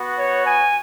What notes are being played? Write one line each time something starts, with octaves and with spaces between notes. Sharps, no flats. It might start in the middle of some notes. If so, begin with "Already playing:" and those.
Already playing: B3 F#4
C#5
G#5